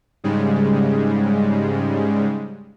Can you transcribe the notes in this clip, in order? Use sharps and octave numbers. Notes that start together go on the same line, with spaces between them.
G#2 C#3 G3 G#3